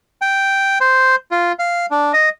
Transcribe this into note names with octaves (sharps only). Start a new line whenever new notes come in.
G5
C5
F4
F5
D4
D#5